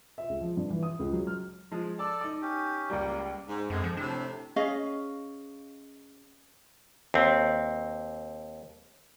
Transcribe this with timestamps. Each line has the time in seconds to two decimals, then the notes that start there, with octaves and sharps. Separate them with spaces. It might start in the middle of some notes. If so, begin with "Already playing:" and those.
0.18 E5
0.29 C#2
0.41 F3
0.57 G2
0.70 E3
0.83 D#6
0.99 C#2
1.12 F#3
1.27 F6
1.72 F3 G#3
1.99 A4 D5 A5
2.21 D#4 D6
2.42 C#4 G4
2.90 C#2 G3 A#3
3.48 G#2
3.70 F#2 D3 G#3 C4
3.84 F3
3.97 A2 C3 D4
4.56 C#4 G#4 D#5 F5
7.14 D#2 C4